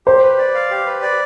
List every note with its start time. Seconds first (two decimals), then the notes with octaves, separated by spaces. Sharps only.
0.06 G4 C5
0.23 B4
0.38 D5
0.55 F5
0.71 G4
0.86 B4
1.02 D5